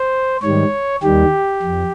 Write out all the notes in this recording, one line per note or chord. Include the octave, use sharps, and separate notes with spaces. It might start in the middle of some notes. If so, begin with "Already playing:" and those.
Already playing: C5
G#2 D#3 G3 C#5
D#2 D#3 G3 G4
F2